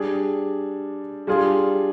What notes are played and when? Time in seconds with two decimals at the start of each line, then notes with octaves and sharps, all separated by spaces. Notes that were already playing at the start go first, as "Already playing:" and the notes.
Already playing: G3 D4 G#4
1.27 G3 D4 F4 G#4